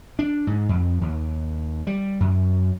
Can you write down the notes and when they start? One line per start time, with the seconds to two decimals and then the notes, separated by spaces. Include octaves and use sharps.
0.19 D4
0.47 G#2
0.69 F2
1.01 D#2
1.87 G3
2.20 F#2